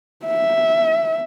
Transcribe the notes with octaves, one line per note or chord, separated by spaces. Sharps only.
E5